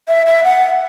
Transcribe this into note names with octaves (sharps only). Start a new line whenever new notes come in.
E5
E5
F#5